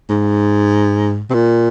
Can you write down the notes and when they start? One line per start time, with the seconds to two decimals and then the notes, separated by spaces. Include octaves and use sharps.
0.09 G#2
1.30 C3
1.34 A#2